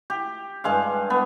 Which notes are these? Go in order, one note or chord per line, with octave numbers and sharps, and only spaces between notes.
G4
G2 G#3 F5
B3